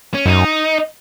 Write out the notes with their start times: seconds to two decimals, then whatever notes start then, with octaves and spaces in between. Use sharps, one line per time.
0.14 C#4
0.26 F#2 D#4